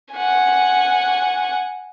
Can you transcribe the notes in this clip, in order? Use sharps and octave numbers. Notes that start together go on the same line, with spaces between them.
F#5 G#5